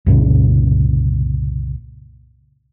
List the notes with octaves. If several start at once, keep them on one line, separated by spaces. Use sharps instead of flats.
C2 F#2 A#2 C#3